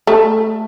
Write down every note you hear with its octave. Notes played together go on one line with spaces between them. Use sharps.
A3